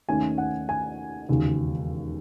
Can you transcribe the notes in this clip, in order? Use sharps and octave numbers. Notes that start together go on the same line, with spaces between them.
D#2 D#3 A3 C#4 G#5
F#5
G#5
E1 D#2 C#3